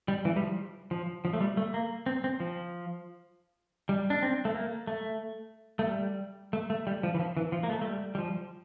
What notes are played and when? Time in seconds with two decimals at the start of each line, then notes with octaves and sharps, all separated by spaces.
0.08 G3
0.25 E3
0.36 G3
0.42 F3
0.91 F3
1.25 F3
1.33 A3
1.41 G3
1.57 A3
1.74 A#3
2.06 C4
2.24 C4
2.40 F3
3.89 G3
4.10 D4
4.23 C4
4.45 A3
4.55 A#3
4.87 A3
5.79 A3
5.87 G3
6.53 A3
6.70 A3
6.87 G3
7.03 F3
7.15 E3
7.19 F3
7.37 E3
7.52 F3
7.63 A#3
7.70 A3
7.81 A3
7.86 G3
8.15 G3
8.18 F3